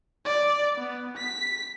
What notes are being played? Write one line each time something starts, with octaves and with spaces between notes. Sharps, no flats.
D5
B3
B6